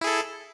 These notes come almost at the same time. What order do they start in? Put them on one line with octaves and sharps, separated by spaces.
E4 G#4 A4